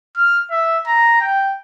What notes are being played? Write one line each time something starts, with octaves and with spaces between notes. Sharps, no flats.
F6
E5
A#5
G5